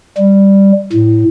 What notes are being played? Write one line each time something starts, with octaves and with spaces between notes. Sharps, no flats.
G3
A2